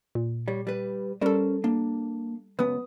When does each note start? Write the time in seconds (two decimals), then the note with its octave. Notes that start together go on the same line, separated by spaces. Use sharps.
0.15 A#2
0.48 G3 C#5
0.67 G3 B4
1.21 G3 C#4 A4 A#4 C5
1.64 A#3 D4
2.59 C#2 F#2 B3 B4 D#6